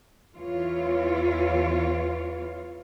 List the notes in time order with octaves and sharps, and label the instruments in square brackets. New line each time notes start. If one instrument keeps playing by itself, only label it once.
[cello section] E2 E3 F4 C#5 F5